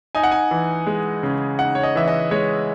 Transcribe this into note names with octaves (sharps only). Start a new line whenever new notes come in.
D#4 G#5
F#5
G#5
E3
G#3
C#3
D#4 F#5
C#5
D#5
E3 E5
D#5
G#3 C#5